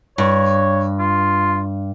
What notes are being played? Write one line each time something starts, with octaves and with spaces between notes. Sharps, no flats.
G2 C#5
F4